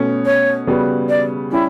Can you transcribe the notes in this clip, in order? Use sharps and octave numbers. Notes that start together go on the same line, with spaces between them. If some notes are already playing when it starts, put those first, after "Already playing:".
Already playing: B2 A3 C#4
C#5
C#3 G3 B3 F#4 B4
D5
G3 C#4 E4 G4